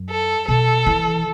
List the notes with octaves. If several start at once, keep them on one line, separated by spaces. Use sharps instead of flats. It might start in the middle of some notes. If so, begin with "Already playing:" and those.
Already playing: F#2
A4
B2 A4
E3